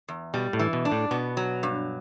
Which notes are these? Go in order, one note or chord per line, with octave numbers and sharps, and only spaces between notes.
E2
B2 G3
A2
E3
B2
D4
A2
B2 B3
F#3
G2